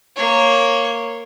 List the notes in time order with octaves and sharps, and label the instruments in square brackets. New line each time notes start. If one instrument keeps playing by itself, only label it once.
[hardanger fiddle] A#3 C#5